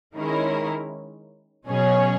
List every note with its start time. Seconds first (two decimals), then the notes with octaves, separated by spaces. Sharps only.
0.15 D#3 G#3 C#4 E4 A#4
1.66 B2 F#3 C#4 G#4 C#5